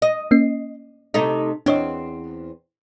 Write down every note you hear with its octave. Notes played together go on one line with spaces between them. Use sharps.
D#5
A#3 C#4 C7
C3 A3 D#4
E2 C4 D4 C#5 D#5